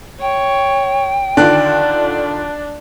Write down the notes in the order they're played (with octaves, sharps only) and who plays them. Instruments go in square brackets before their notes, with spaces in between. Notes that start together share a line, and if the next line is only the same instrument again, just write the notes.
[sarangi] C#5 [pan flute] G5
[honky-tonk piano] D3 D#3 F4 [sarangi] D4 [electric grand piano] D5 A5 F#6